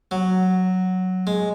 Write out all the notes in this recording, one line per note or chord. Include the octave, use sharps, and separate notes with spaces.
F#3
G#3